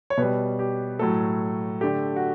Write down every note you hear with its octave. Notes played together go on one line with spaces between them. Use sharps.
C#5
B2 G3 B4
G4
A2 F#3 A3 A4
D3 A3 G4
F#4